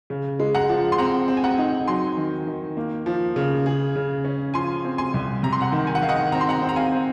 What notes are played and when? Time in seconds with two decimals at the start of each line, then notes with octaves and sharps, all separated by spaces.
0.10 C#3
0.40 G#3
0.55 F#5 A#5
0.69 F3
0.92 C6
0.98 C4 F#5 A#5
1.28 C4
1.37 G#5
1.44 F#5 A#5
1.58 D#4
1.87 F#3 G#5 C6
2.17 D#3
2.47 D#3
2.77 A#3
3.06 F3
3.36 C#3
3.66 G#4
3.96 C#3
4.25 C#4
4.54 F3 G#5 C6
4.84 C4
4.98 G#5 C6
5.14 C2
5.43 C3 A#5
5.52 C6
5.60 F#5 A#5
5.72 D#3
5.87 G#5
5.95 F#5
6.02 D#3 F5
6.09 D#5 F#5
6.32 C4 A#5
6.41 C6
6.49 F#5 A#5
6.62 C4
6.69 A#5
6.76 F5 G#5
6.92 C4